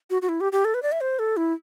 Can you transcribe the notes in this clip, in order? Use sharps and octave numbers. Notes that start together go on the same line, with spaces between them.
F#4
F#4
E4
G4
G4
A4
B4
D5
E5
C5
A4
E4